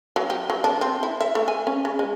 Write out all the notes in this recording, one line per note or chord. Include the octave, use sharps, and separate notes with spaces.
F#3
G4
F#3
D4
C4
E4
E5
A3
G#5
C#4
C#3
G#3